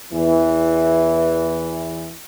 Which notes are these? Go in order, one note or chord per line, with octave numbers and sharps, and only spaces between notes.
E2 E3